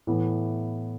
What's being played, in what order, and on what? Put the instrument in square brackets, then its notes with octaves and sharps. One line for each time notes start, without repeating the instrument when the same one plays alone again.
[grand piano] A2 E3 B3